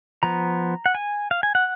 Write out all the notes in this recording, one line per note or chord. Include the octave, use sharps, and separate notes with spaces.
F3 B3 A#5
F#5
G#5
F5
G#5
F#5